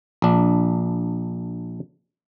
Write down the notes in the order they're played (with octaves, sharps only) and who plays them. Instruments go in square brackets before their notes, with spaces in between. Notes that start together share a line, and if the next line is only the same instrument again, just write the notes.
[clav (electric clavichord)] A#1 D4